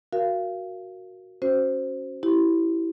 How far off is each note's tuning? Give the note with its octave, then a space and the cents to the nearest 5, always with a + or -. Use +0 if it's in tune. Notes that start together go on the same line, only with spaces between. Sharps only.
F#4 +0 A#4 +0 F5 -25
C#4 -10 F#4 +5 C5 +0
E4 +0 G4 -20